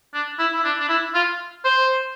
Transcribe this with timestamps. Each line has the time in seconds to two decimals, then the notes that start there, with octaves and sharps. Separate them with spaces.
0.14 D4
0.39 E4
0.54 E4
0.64 D4
0.80 D4
0.89 E4
1.14 F4
1.65 C5